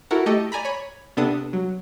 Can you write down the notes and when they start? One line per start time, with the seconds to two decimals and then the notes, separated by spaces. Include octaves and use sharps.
0.11 E4 F#4 A4 A#4 F#5
0.26 A3 G4 A4 D#5 C#6
0.52 D5 G#5 A#5 B5
0.65 C#5 B5
1.17 C3 B3 D4 A4 D#6
1.53 F#3